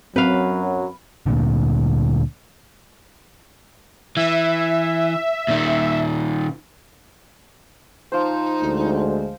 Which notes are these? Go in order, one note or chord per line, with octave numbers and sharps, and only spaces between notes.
F#2 F#3 C4 B4 F5
D2 A#2 D3
E3 E5
A#2 D#3
F3 D#4 C5
D2 G#3